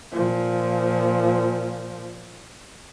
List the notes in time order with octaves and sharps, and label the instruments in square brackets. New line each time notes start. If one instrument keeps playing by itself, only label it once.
[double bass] A#2 F3